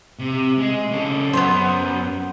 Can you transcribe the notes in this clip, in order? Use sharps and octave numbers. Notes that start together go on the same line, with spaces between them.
C3
G#3
C#3 A4
F#2 B3 C5